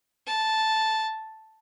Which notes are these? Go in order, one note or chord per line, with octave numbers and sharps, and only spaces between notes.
A5